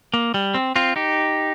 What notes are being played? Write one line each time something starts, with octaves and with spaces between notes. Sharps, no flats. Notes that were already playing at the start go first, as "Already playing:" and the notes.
A#3
G3
C4
C4 F4
D#4 G4